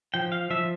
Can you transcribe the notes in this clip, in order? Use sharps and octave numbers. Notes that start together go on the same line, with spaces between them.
F3 G5
F5
F3 E5